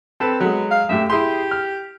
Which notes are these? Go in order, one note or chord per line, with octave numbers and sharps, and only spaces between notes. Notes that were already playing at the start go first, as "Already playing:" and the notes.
C4 A4 B4 A5
F#3 G#3 B3
F5
F#2 A2 G4 E5
E4 G4 G#4 C6
F6